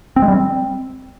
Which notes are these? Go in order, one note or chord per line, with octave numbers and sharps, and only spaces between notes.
C4
G#3
G3
C4